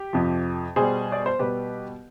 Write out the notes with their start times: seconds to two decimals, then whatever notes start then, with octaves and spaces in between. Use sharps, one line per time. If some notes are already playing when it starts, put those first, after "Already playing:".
Already playing: G4
0.13 F2 C3 F3
0.76 B2 G3 G#4 C5
1.12 D5
1.26 C5
1.39 B2 G3 G4 B4